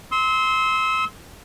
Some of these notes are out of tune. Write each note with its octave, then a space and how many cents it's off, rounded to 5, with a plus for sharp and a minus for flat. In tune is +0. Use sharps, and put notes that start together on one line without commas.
C6 +0 E6 -35